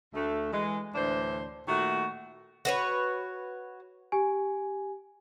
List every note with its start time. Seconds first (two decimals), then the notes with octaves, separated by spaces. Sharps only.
0.14 D2 A3
0.52 E3 G#3
0.94 D2 A2 E3 D4 C5
1.67 A#2 D#3 A3 F#4
2.65 F#4 B4 C#5
4.12 G4 G#5